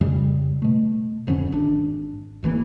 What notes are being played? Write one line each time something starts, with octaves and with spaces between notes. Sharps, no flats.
F2 C#3 G3
B2 A3
D1 F2 D3 C#4
G#1 D4
D#1 G#1 E3 A#3